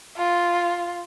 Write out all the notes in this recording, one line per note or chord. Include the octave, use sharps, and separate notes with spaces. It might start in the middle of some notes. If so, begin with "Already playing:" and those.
F4